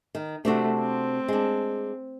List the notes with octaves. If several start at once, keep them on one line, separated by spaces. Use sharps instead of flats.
D#3
C3 A3 D4 F#4
C4
G#3 D4